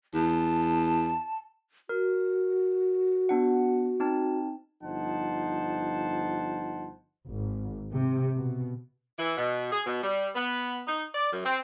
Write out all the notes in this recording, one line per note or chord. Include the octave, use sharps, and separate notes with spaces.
E2 A5
F#4 A#4
B3 D4 F#5
C4 D#4 A5
G1 F3 D#4 C5 F#5 A5
G#1
C3
B2
E3
B2
G#4
B2
G3
B3
D#4
D5
F#2
C4